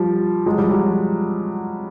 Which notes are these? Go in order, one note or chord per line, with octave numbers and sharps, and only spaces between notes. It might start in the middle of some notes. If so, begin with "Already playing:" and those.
Already playing: F3 G3
F#3 G#3
F3 G3
F#3
F3